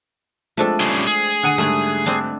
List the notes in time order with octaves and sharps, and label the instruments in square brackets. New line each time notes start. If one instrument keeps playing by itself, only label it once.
[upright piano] F3 G#3 C4 [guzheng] A3 D4 A4
[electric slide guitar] G3 C#4 G#4
G#4
[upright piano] D3 F#5 D#7
[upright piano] G#2 D3 G3 [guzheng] A3
[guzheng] C4 D4